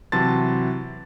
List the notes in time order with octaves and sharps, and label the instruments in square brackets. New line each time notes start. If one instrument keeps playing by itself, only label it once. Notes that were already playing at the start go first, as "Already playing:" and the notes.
[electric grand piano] C3 E3 F#3 A5 C6 A6